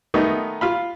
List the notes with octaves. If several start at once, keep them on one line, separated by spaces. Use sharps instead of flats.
D#3 A3 B3 D#4
F4 F5 B5